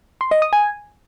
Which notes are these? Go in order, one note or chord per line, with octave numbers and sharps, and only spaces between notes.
C6
D#5
D#6
G#5